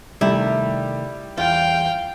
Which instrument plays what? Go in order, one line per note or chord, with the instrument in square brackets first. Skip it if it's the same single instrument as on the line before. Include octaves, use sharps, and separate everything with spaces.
[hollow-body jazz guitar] C3 D#3 A3 [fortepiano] G3 [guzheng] E4
[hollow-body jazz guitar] E2 [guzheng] F4 [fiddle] F5 G5